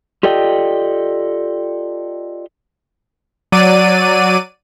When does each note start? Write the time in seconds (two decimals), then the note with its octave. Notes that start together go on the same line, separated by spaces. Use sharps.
0.23 F4 G4 A4 D5 D#5 G5
3.52 F#3 D5 D#7